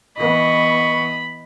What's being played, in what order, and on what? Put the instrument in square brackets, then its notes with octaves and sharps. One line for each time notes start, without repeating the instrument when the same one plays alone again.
[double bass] E3 B3 [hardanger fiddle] D#5 [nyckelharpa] B5 [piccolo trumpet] C#6